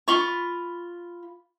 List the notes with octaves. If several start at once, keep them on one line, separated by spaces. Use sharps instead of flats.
F4 B5 C#6